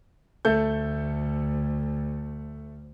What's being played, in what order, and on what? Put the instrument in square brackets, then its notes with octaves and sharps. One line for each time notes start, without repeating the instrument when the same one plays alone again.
[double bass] D2 [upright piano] A3 A4 G6